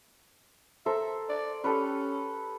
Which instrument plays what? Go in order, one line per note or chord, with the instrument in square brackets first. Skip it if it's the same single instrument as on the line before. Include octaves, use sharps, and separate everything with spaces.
[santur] A4 A#4 C5 [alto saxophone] E5
[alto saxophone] D5
[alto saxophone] C#4 [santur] G4 A4 B4